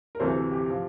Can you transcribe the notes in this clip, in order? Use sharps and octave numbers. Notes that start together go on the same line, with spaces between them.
A#4
D2 C3 E3 A4 C5
G4
F3